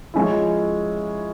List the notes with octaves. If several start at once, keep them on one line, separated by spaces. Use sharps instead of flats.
F3 G#3 C#4 E4